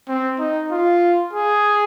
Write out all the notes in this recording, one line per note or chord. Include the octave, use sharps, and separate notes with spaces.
C4
D#4
F4
G#4